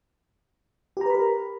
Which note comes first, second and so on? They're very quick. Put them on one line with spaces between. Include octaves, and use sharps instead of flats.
G4 A#5 B4 B5 A#4